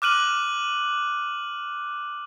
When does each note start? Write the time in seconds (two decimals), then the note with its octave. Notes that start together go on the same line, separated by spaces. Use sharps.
0.02 D6 F6 F#6 D#7 F#7